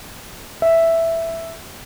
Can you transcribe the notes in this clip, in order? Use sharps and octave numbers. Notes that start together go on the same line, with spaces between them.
E5